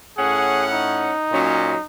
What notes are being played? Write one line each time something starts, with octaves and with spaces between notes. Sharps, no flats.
A2 C#4 G#4 F#5
D#4
A#2 F#3 C#4